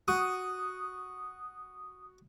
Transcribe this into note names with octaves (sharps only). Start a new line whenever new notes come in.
F#4 D#6